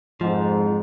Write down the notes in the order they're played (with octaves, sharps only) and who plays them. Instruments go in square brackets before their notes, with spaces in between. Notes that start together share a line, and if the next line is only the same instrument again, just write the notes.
[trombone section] F2 G#2 [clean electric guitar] F3